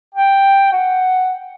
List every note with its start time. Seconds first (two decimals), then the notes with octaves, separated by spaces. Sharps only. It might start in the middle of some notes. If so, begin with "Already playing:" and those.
0.14 G5
0.72 F#5